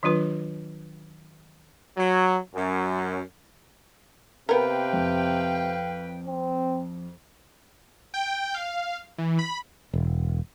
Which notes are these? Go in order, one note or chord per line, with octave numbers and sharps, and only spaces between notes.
D#3 F#3 D4 F4 B4
F#3
F#2
C3 B3 A#4 B4 F5 G5
F2
C4
G5
F5
E3
B5
E1